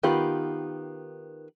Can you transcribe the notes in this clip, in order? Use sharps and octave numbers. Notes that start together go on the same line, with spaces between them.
D#3 B3 F4 G4 B5